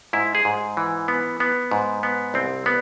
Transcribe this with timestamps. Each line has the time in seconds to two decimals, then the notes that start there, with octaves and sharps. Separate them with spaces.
0.13 G#2 E4
0.35 G#4
0.45 G#2
0.77 E3
1.08 B3
1.40 B3
1.71 G#2
2.03 B3
2.34 C2 C4
2.66 B3